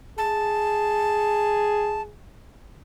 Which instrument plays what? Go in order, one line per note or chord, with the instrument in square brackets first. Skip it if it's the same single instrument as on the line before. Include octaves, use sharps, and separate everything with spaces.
[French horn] G#4 [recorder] A5